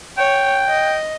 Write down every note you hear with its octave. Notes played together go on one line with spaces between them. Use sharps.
C#5 G5
D#5